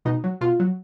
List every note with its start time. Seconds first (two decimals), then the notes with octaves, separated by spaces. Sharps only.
0.05 B2 D#4
0.24 F#3
0.41 B2 F4
0.60 F#3